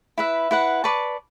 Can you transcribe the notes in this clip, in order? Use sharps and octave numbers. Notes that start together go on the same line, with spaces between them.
E4 B4 E5
E4 B4 F#5
B4 D5 A5 C#6